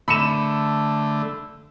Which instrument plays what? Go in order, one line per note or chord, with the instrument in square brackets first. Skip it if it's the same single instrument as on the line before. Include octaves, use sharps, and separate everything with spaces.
[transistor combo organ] D3 A3 [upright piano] B5 C#7 E7